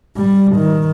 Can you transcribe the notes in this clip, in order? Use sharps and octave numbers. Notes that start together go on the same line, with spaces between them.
G3
D#3